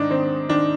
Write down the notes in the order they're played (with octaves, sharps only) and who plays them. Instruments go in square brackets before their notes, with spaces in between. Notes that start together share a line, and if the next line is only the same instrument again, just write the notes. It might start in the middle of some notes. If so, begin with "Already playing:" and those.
Already playing: [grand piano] G#2 D#3 D4 D#4
D#3 C4
D#3 D4